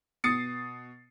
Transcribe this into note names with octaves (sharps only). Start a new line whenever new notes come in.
B2 D#6 A6 C7 C#7